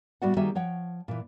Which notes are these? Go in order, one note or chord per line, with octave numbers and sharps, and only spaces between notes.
A2 G3 B3 F#4 D5 F#5
D#3 G3 A#3 F#4 G#4 E5
F3 C#5 F#5 G5
A#2 E3